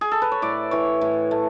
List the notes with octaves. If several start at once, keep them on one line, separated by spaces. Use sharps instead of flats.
G#4
A4
B4
C#5
A2 D5
E3 C#5
A2
A3